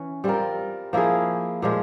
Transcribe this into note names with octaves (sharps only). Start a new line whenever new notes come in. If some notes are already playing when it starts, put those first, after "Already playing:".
Already playing: E3 C#4
G3 C4 F4 A#4
F3 A#3 E4 G#4
A#2 F3 G#3